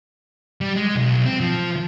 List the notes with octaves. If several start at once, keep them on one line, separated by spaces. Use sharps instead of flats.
G3
G#3
B1
C4
F3